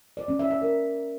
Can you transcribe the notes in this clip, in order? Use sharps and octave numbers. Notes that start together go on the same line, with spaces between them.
D5
C#4
E5
E5
A#4